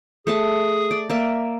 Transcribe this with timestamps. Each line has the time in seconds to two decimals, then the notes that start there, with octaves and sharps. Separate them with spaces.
0.27 A3 G#4 E5 A5
0.91 D5
1.10 A#3 D5 E5